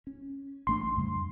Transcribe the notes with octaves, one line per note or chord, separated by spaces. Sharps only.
C#4
A1 A3 D4 C6
F2 C#3 G3